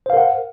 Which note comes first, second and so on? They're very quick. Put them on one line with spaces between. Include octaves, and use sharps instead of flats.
C5 F5 A#4 F#5